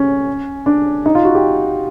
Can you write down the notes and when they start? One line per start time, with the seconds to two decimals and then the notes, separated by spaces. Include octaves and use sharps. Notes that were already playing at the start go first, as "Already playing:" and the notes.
Already playing: C#4
0.66 D4
1.06 D#4
1.15 F4
1.25 F#4
1.34 G4